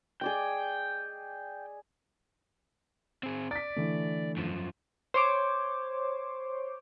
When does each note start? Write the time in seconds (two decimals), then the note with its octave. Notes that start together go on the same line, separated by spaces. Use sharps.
0.21 G#4 D5 D#5 G5
3.23 C4 G#4
3.51 D5 A6 B6
3.76 D3 E3 A3
4.37 F#2 F3
5.14 C5 C#5 D6